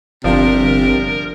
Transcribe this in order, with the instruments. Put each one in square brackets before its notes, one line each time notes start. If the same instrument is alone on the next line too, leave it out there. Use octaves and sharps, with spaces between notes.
[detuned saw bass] G1 [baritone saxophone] C3 [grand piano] F3 D4 F4 [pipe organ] A#4